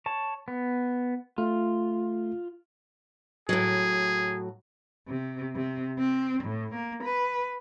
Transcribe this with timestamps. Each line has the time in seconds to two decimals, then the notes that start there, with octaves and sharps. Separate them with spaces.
0.06 C#5 A5
0.48 B3
1.38 A3 F4
3.49 A2 F#3 G#4
5.09 C3
5.55 C3
5.98 C4
6.44 A2
6.74 A#3
7.04 B4